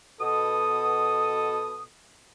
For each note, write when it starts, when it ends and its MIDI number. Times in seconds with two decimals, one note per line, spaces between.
0.21 1.83 47
0.21 1.88 69
0.21 1.83 87